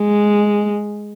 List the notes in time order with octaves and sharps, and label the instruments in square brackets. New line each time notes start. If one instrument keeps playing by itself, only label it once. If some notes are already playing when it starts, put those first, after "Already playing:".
Already playing: [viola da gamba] G#3